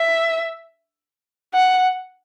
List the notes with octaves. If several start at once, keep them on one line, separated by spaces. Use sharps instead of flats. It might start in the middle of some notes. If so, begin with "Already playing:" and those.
Already playing: E5
F#5